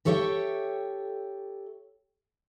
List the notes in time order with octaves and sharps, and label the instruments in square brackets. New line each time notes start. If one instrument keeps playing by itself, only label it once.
[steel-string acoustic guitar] G4 A4 C#5 E5 F#5 G5